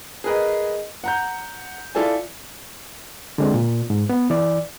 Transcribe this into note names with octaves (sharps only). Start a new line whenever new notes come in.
G#4 A#4 B4 D#5
F#5 A#5 G6
E4 F4 A4 D5 G#5
D3 G#3 C4
A#2
G#2
B3
E3 D5